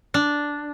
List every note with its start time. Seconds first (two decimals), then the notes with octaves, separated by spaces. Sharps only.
0.14 D4